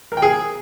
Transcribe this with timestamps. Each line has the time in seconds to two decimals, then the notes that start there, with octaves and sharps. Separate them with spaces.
0.12 A#4
0.17 G5
0.22 G#4